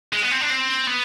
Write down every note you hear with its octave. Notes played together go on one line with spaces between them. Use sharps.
G#3
B3
C4
D4
C4
B3